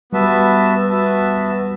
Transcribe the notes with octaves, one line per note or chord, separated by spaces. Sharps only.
G3 B3 F#4 B4 E5 A5
B3 F#4 B4 E5 A5